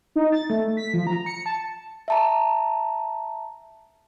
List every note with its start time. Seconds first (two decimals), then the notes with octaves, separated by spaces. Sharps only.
0.16 D#4
0.32 A6
0.50 A3
0.77 B6
0.93 F3
1.07 A#5
1.26 C#7
1.46 A5
2.08 E5 A5 A#5